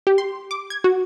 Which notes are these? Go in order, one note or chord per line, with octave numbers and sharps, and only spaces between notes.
G4
C6
D6
G#6
F#4